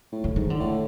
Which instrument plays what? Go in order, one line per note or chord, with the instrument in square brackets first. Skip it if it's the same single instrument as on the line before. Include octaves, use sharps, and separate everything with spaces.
[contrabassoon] A2
[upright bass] D3
[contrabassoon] G#2 [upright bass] D#3
[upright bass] D3
[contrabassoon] A2